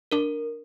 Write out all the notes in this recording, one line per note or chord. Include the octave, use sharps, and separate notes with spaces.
D4 A#4